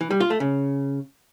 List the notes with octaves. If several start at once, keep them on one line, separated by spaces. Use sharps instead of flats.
E3
G3
F4
A3
C#3